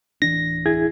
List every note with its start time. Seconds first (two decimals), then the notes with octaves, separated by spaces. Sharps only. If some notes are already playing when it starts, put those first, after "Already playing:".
0.22 D1 E3 D4 A#6
0.66 E4 G#4 G#6